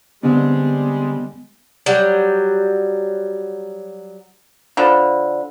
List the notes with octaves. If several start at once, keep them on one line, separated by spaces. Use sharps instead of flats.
D3 G3 G#3 B3 C4 D4
F#3 G3
D3 F3 B5